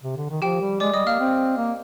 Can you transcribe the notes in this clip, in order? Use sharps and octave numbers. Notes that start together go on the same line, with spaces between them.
C3
D3
D#3
F3 G4 G5
G3
G#3 D5 D6
G3 D#5 D#6
A#3 F5 F6
C4
A#3